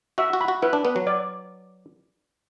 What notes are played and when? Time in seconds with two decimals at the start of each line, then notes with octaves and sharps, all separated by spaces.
0.18 F#4 E5
0.33 F#4
0.41 B5
0.48 F#4
0.62 E4 B4
0.73 D4
0.85 B3 B4
0.96 F#3
1.07 D5